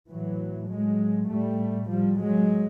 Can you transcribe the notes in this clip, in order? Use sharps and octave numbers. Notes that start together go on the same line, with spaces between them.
A2 E3 F#3
F#3 G#3
A2 G3 A3
F3 G3
F#3 G#3